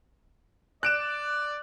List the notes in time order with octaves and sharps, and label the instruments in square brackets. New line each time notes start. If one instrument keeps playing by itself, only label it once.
[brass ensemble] D5 [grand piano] F#6 D7 E7